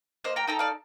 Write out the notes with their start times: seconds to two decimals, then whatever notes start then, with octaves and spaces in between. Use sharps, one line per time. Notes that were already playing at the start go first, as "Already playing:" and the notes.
0.24 A#3 C5 D#5
0.36 G5 A#5
0.47 D#4 A4 G5 A#5
0.59 D5 F5